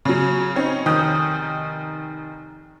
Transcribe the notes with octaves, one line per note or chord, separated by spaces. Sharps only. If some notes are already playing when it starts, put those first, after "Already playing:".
C#3 F#3
C4 C#4 D#4
F1 D#3 D#6 G6